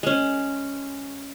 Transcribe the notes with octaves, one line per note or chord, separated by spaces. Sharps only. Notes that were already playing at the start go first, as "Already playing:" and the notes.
G#3 C#4